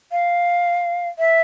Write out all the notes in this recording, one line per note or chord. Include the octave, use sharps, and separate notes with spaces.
F5
E5